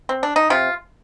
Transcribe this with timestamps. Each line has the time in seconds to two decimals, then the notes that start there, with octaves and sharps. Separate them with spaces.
0.09 C4
0.23 D4
0.36 D#4
0.50 C3 F4